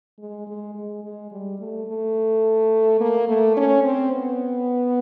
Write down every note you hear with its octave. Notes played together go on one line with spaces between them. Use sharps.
G#3
G#3
G#3
G#3
G3
A3
A3
A#3
A3
C#4
C4
B3